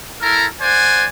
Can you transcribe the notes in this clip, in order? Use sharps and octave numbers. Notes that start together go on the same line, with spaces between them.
E4 A4 A#4
C5 D5 F#5 G#5